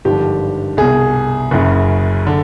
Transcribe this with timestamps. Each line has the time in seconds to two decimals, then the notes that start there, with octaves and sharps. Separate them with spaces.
0.05 G#1 G2 D3 F3 G4
0.77 C2 B2 G#4
1.51 F#1 F#2 C#3
2.27 D3